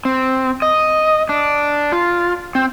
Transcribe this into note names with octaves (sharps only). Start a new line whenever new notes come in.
C4
D#5
D4
F4
C4